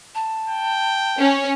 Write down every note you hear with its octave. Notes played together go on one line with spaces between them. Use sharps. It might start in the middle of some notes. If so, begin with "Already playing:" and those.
A5
G5
C#4